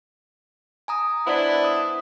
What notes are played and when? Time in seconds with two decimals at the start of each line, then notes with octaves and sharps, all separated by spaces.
0.88 G#5 A#5 D#6
1.27 B3 D4 E4 C5 D5
1.64 D#6